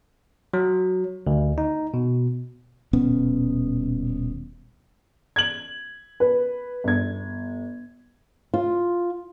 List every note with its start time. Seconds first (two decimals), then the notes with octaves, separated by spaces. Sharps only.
0.54 F#3
1.27 D2
1.58 D#4
1.94 B2
2.93 D#1 B2 B3 C#4
5.36 G#6 F#7
6.20 B4
6.84 G1 G#6
8.54 F4